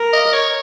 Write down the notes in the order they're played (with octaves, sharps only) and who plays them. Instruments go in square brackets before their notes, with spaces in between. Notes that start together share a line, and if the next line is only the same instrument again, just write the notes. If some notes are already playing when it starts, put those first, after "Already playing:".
Already playing: [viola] A#4
[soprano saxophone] D#5
C#5